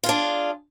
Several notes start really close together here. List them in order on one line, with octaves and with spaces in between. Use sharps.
F4 G#4 D4